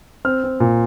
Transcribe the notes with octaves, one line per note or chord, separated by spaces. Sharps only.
C4 F6
C4
A#2